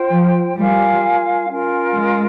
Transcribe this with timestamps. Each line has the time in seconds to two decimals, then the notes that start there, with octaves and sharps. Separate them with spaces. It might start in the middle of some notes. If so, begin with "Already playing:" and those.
Already playing: F4 C5 G5
0.11 F3
0.56 G3 F4 A#4 F5 G#5
1.49 C#4 F4 A#4
1.94 G#3